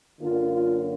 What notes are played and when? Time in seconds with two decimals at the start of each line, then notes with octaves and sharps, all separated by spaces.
0.20 F#2 D3 F#3 A#3 F4
0.51 F4